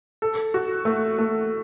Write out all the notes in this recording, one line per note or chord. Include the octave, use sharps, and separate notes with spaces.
A4
F#4
A3
A3